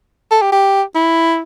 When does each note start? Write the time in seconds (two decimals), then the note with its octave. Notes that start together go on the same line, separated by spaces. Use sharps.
0.31 A4
0.42 G4
0.52 G4
0.95 E4